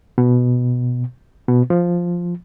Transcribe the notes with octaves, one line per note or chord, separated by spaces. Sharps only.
B2
B2
F3